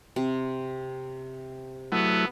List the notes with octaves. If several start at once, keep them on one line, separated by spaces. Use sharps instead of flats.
C3
F#3 A3 B3 E4